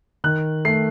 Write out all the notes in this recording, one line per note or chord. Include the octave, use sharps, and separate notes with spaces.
D#3 F#6
A3 C7